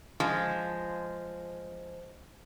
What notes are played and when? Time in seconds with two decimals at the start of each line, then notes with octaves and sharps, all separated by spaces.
0.20 F3 G#3